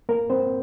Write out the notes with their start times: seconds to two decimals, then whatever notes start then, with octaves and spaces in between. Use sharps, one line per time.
0.09 A#3 A#4
0.30 C4 C5